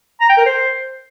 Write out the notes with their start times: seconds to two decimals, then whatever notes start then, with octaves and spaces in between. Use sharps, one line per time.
0.21 A#5
0.29 G5
0.37 A#4
0.46 C5